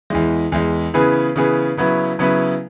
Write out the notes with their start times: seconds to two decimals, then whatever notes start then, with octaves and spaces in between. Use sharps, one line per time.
0.10 E2 E3 G#3
0.52 E2 E3 G#3
0.94 C#3 E3 B3 G#4 B4
1.36 C#3 E3 B3 G#4 B4
1.77 C#3 F#3 B3 E4 B4
2.19 C#3 F#3 B3 E4 B4